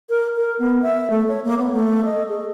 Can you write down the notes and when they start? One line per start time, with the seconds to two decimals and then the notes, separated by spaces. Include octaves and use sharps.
0.09 A#4
0.36 A#4
0.59 B3
0.82 E5
1.10 A3
1.28 C#5
1.44 A#3
1.59 B3
1.72 A3
2.05 D#5
2.29 G#4